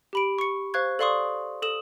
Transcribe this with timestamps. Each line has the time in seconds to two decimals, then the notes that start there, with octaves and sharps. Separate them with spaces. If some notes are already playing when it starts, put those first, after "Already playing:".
0.13 G4 B5 D7
0.38 C#6 C#7
0.74 C5 F5 C#6 F#6 G#6
0.99 A4 D5 F5 C6 C#6 D#6
1.62 A4 D#6 E7